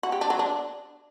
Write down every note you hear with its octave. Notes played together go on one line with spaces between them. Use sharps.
F#4
G4
D4
F#3
D4